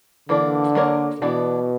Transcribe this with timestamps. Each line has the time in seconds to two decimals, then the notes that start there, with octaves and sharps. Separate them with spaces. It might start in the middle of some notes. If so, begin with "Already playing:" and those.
0.29 D3 E3 A#3 D4
0.75 F#3 A#3 D4 A#4 C#5
1.22 B2 E3 B3 D4